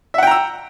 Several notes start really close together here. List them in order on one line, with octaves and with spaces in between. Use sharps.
E5 F#5 G5 A#5 E6